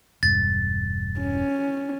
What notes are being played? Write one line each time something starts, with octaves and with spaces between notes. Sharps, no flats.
E1 G2 A6
C#4